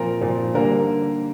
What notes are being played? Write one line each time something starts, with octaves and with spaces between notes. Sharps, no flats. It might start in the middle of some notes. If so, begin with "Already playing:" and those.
Already playing: A#2 F3 C4 A#4
A#2 F3 C4
D3 G3 A#3 A#4